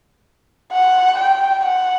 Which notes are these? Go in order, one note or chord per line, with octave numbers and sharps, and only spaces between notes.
F#5
G5
F#5